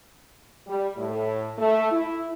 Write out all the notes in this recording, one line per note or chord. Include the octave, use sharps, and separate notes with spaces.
G3
A2
A3
E4